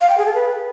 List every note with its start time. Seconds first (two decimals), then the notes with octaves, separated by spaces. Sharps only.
0.01 F5
0.09 G5
0.18 G#4
0.26 A4
0.34 B4